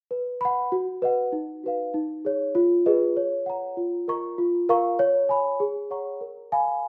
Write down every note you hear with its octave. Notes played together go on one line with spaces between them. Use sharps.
B4
F#5 B5
F#4
B4 D#5 F#5
D#4
F#4 B4 F5
D#4
G#4 C#5
F4
G#4 B4 D#5
C#5
F#5 A#5
F4
A#4 D#5 A#5 C#6
F4
A#4 F5 A#5 C#6
C#5
G#5 B5
G#4
C#5 F#5 A#5 C#6
A#4
F5 G#5 B5